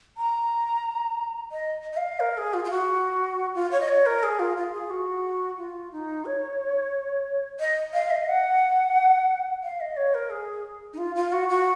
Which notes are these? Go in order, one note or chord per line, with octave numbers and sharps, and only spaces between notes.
A#5
D#5
D#5
F5
A#4
G#4
F4
F4
F#4
F4
C#5
D#5
C#5
A#4
G#4
F4
F4
G#4
F#4
F4
D#4
C#5
D#5
F5
D#5
F#5
F5
D#5
C#5
A#4
G#4
D#4
F4
F4
F#4
F#4